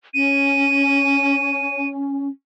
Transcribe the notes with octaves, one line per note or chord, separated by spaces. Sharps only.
C#4 D#7